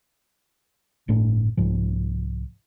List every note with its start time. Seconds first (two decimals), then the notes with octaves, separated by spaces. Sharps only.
1.08 G1 A2 A3 D4
1.57 C2 G#2 F3